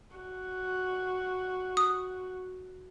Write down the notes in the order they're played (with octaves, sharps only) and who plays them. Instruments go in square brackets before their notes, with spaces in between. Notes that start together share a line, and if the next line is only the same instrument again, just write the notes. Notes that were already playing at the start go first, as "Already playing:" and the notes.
[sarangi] F#4
[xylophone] D#6